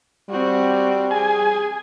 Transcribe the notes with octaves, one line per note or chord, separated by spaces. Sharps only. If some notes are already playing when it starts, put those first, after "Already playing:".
G3 C4 F#4
G#4 G#5